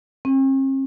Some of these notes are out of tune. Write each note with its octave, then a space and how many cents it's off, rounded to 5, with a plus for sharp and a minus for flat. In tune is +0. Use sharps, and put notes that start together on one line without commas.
C4 +45